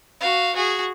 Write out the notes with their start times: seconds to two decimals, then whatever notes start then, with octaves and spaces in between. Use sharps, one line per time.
0.20 F#4 F5
0.55 F#4 G#4